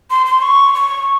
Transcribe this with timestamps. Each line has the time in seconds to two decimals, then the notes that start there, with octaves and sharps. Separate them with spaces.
0.11 C6
0.26 C6
0.42 C#6
0.75 C#6